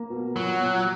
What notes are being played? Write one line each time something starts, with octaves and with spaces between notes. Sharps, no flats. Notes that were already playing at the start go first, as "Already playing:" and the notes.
Already playing: A#3
B2
A#2 F#3
A#2